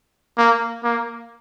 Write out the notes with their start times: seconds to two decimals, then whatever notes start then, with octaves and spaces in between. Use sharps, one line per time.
0.38 A#3
0.84 A#3